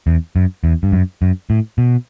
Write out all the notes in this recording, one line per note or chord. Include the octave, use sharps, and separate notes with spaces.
E2
F#2
E2
G2
F#2
F#2
A2
B2